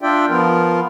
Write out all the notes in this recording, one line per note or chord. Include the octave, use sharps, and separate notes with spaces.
D4 F4 D5 E5 G5
F3 B3 F4 A#4